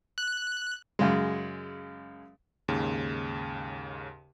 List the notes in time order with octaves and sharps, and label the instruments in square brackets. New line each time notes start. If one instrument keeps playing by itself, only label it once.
[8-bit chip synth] F#6
[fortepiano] F#2 C#3 G#3
[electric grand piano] D#2 G#2 C#3